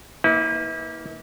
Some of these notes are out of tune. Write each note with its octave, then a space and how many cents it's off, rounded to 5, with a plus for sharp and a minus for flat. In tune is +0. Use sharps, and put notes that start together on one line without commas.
A#3 +0 E4 -40 B4 +0